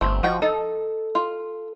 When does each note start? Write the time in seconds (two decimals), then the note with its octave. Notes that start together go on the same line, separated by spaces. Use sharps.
0.01 G1 A3 C4
0.23 F3 D#4 F#4 G5
0.42 D#4 A4
1.15 F4